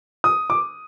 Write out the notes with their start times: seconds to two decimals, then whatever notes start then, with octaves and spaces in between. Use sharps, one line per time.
0.24 D#6
0.50 D6